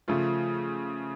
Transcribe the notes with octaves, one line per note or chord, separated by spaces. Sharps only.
C#3 F3 A3 F4